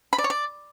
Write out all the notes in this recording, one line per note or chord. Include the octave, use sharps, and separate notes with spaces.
B5
D5
C#5
D5